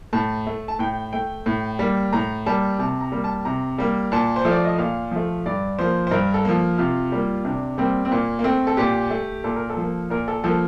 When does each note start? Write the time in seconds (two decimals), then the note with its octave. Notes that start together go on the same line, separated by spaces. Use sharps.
0.13 A2 A5
0.47 A3
0.68 A5
0.79 A2 G5
1.13 A3 G5
1.46 A2
1.79 G3 A#3
2.13 A2 A#5
2.46 G3 A#3 A5
2.79 C3 A5
3.01 A#5
3.12 G3 A#3
3.24 A5
3.45 C3 A#5
3.78 G3 A#3
4.12 A#2 A5
4.36 C5
4.45 F3 A3
4.51 D5
4.65 D#5
4.78 A#2 F5
5.11 F3 A3
5.46 G2 D5
5.79 F3 A#3 C5
6.07 C5
6.11 G2 A#4
6.34 A4
6.45 F3 A#3
6.78 C3 F4
7.12 G3 A#3
7.45 C3 D4
7.78 G3 A#3 C4
8.05 C4
8.11 A#2 A#3
8.39 A#3
8.44 A3 C4
8.67 A4
8.77 A#2 G4
9.10 A3
9.44 A#2 A4
9.56 A#4
9.70 A4
9.77 F3 A#3
10.10 A#2 A#4
10.28 A4
10.44 F3 A#3 A4